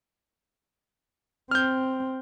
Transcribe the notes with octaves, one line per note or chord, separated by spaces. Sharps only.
C4 F6 G6